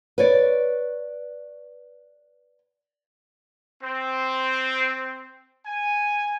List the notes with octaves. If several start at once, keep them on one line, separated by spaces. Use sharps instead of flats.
B4 C#5 D5
C4
G#5